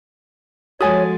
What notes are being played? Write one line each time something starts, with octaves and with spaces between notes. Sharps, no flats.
F3 G#3 F#4 A4 C#5 G#5 D#6 A6